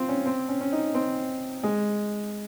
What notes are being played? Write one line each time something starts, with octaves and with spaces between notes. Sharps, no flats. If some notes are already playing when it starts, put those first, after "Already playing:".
Already playing: C4 F4
C#4
C4
C#4
C#4
D#4
C4
G#3